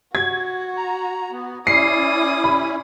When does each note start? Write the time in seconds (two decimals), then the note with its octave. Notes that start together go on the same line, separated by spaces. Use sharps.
0.15 F#4 G#6
0.77 A#5
1.32 B3
1.67 C#4 E4 D5 D#6 C7
2.44 B5